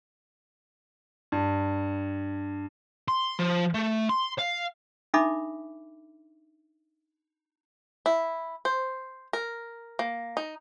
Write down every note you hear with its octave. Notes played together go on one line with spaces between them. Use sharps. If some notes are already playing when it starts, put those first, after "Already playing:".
G2
C6
F3
A3
C6
F5
D4 D#4 A4 E5 B5 D6
E4
C5
A#4
A#3
D#4